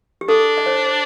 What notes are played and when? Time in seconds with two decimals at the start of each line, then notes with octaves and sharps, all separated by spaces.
0.21 G4
0.29 D4 A4
0.58 D5
0.66 C5
0.86 C5